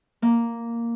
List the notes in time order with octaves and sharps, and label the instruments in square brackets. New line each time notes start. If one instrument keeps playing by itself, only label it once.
[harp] A#3